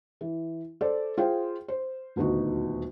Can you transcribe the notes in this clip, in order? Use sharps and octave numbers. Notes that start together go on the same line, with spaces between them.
E3
A4 C5 D5
F4 G#4 C5 G5
C5
D#1 D2 B3 D#4 F#4